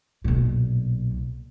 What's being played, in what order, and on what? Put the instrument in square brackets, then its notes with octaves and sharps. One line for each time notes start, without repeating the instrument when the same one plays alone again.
[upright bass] B1 A#2